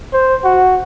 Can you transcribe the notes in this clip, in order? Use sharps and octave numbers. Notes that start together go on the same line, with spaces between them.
C5
F#4